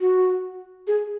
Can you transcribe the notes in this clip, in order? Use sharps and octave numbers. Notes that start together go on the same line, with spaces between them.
F#4
G#4